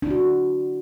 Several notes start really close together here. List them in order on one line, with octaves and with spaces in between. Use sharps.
D4 E4 F#4